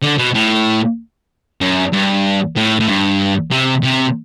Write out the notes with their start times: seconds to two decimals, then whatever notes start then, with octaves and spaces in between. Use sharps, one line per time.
0.03 D3
0.18 B2
0.34 A2
1.61 F#2
1.93 G2
2.56 A2
2.80 A2
2.88 G2
3.51 C3
3.84 C3